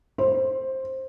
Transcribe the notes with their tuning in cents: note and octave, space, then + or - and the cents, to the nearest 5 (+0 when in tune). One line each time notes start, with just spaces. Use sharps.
C5 +15